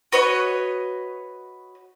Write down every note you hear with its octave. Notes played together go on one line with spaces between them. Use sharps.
F#4 B4 C#5 D#5